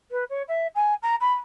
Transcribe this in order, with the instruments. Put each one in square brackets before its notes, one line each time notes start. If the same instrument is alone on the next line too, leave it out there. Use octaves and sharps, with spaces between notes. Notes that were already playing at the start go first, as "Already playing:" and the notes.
[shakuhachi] B4
C#5
E5
G#5
A#5
B5